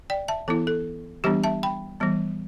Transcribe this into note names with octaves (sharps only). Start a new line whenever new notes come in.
D5 G5
E5 A5
E3 B3 E4 A4
A4
E3 G3 B3 D4 G4
E5 A5
G5 B5
E3 G3 B3